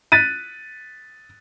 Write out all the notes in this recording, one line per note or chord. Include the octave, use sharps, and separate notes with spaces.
F#6 A6 B6 D#7